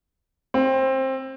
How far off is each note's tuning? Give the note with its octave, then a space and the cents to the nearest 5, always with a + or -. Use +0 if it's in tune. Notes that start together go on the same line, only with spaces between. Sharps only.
C4 +20